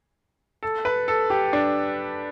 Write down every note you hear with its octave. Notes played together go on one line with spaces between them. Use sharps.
A4
B4
A4
G4
D4